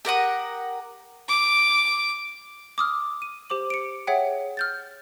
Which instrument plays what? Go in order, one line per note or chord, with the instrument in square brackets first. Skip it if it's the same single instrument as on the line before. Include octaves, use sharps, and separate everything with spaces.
[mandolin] G4 A#4 F#5 D#6
[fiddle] D6
[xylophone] D6 D#6 F6
D#7
G4 C5 D6 F#7
C#7 D7
G#4 C#5 E5 F#5 G5
F6 G6 A6